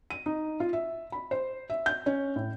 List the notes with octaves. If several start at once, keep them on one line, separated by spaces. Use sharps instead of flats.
D#7
D#4
F4
E5
B5
C5
E5
G6
C#4
A2